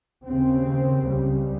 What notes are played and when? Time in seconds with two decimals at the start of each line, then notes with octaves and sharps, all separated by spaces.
0.24 D#2 C#3 C4
1.07 C#2 C#3 G3